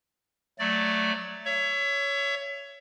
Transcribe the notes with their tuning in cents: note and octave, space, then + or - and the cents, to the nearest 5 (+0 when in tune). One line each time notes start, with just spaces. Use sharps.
F#3 +0 A3 +0 D5 +0
C#5 +15 E5 +25